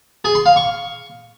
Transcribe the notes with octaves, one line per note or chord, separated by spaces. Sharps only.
G#4
C6
F5
C#6